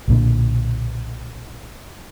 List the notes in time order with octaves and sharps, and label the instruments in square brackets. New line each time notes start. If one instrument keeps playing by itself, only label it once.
[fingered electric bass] B1 A#2 D3